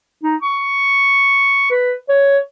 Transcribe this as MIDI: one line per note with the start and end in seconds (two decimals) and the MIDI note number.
0.23 0.36 63
0.42 1.68 85
1.70 1.94 71
2.09 2.38 73